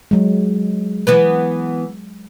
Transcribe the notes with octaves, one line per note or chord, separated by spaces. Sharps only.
F#3 G#3
E3 B3 B4